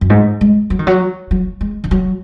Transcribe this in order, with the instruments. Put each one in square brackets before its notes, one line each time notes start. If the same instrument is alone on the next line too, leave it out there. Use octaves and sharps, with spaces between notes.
[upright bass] F#2
G#2
G#3
F#3
D#3
F#3
F#3
G#3
D#3
F#3